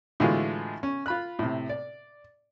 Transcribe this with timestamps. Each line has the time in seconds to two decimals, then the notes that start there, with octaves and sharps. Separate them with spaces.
0.20 A2 D3 E3 G#3 F4 F#4
0.83 C#4
1.06 F4 B5 F#6
1.39 A2 C3
1.69 D5